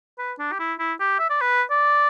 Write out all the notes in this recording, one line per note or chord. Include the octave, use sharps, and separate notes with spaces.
B4
D4
G4
E4
E4
G4
E5
D5
B4
D5